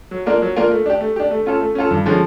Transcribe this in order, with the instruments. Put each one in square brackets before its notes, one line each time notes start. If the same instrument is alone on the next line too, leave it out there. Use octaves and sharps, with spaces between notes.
[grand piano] F#3
A#3 D4 F4 A#4
F#3
A#3 D4 F4 A#4
A3
D4 G4
A3
D4 G4
A3
C#4 F4 A4
A3
C#4 F4 A4
G2
D3 F3 G#3 C#4